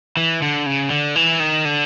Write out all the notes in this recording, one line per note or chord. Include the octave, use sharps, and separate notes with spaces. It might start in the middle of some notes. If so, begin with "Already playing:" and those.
E3
D3
C#3
D3
E3
D#3
D3